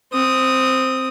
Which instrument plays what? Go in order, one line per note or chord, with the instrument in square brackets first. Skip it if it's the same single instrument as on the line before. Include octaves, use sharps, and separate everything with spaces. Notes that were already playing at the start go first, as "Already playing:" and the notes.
[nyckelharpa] C4 D#6